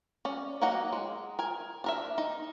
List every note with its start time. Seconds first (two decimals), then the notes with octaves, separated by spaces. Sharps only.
0.25 C#4 D5
0.61 F#3 A#3 D#4 F#5 A#5
0.93 G#3
1.39 A#4 G#5
1.84 D4 A#4 E5
2.18 D#4